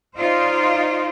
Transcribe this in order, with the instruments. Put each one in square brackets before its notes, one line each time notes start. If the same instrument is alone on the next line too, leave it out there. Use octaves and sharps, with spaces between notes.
[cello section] D#4 F4 C5 D5